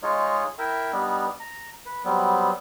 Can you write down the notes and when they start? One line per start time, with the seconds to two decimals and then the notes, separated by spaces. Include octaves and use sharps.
0.03 G#3 D#4 F4 C#5
0.59 E4 A#4 E5 G5
0.93 G3 B3 D4 D#4
1.40 A#5
1.86 B4
2.05 F#3 G3 B3 C4